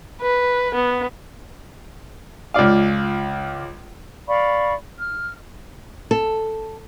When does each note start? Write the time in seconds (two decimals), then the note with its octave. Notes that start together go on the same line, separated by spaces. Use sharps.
0.22 B4
0.75 B3
2.54 C#2 F4 D5 F5
4.28 D5 F5 B5 C#6
4.99 F6
6.11 A4